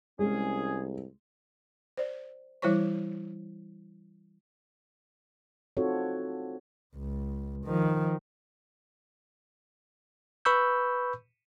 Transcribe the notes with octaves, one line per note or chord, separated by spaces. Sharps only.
C2 G#3 C#4 G#4
C5 D5
E3 G3 E4 C5 C#5 C#6
C4 D#4 F4 F#4 A4 C#5
C#2
D#3 F3
B4 B5 C#6 E6 G6